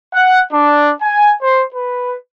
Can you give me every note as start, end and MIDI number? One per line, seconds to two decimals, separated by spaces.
0.14 0.40 78
0.53 0.91 62
1.01 1.34 80
1.42 1.63 72
1.74 2.15 71